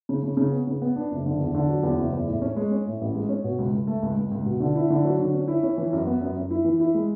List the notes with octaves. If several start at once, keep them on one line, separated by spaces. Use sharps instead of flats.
C#3
C#3
C#3
B3
C#3
B3
D4
F#1
D3
E2
D3
F#3
E2
F#1
E2
A2
C#4
G#3
C#4
A2
A1
G#3
C#4
B2
C#2
C#2
A3
C#2
C#2
C#2
B2
D3
E4
D3
F#3
D3
C#4
E4
C#4
E3
F#2
B3
F#2
F#2
E4
E3
E4
G#3